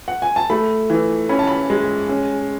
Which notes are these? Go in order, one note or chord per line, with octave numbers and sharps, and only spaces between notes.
F#5
G#5
A5
A3 B5
E3
C#4 B5
A5
B5
G#3
C#4